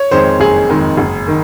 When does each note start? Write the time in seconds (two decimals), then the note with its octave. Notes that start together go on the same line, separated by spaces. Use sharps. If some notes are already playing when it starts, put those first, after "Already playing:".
Already playing: C#5
0.11 F2 D#3 G#3 C5
0.40 F#1 G#4
0.69 F2 D#3 G#3
0.97 F#1
1.28 D#3